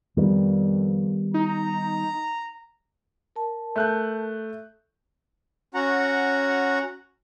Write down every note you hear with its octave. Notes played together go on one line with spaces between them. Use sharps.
F2 D#3 G3 B3
D#4 A#5
A#4 A5
A3 F#6 G6
C#4 F#4 F#5 A#5